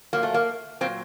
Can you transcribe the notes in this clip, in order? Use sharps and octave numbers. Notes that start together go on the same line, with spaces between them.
A#2 F#3 A#3
A3
A#3
A#2 F#3 C4